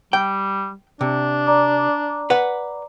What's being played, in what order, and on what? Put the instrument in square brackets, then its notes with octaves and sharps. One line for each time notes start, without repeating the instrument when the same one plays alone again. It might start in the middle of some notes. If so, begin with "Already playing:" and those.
[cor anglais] G3 [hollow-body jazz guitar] G5
[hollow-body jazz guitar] C3 [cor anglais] D4
[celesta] D5 A#5 D6
[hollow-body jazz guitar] B4 F#5